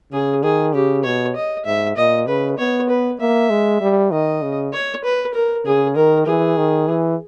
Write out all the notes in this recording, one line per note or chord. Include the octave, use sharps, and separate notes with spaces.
C#3 G#4
D#3 G#4
C#3 G4
B2 C#5
D#5
G#2 E5
A#2 D#5
C#3 B4
B3 C#5
B4
A#3 E5
G#3
G3
D#3 D#5
C#3
C#5
B4
A#4
C#3 G#4
D#3 A#4
E3 G#4
D#3
E3